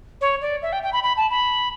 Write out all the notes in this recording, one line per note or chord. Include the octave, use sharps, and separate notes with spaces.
C#5
D5
E5
G5
G5
B5
B5
A5
B5